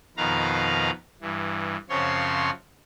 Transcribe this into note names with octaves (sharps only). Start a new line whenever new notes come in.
F2 B2 D#3 B4 F5 A#5
G2 E3
F#2 C#3 F3 C4 C#5 C6